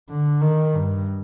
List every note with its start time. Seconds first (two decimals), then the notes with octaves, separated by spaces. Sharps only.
0.09 D3
0.42 D#3
0.74 G2